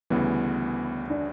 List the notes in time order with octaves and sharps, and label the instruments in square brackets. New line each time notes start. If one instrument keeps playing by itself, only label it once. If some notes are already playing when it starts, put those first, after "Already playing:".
[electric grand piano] D2 C#3 E3 G3 [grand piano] B3
[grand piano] D4